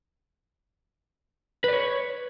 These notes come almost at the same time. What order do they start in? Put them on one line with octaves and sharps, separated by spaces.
B4 D5 C#5